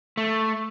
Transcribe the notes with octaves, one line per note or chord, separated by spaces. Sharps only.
A3